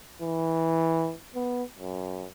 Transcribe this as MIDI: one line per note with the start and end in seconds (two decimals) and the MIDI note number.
0.22 1.13 52
1.35 1.63 59
1.79 2.27 42